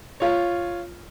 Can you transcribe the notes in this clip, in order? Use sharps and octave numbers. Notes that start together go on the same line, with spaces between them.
F4 C#5